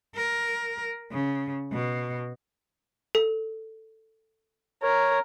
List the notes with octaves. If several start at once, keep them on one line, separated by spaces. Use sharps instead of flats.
A#4
C#3
B2
A4
A#4 C#5